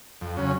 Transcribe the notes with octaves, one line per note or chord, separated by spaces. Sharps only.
F2
C#3 F#3 C#4